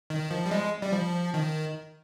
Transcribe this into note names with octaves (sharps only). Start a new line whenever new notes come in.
D#3
F3
G3
G#3
G3
F3
D#3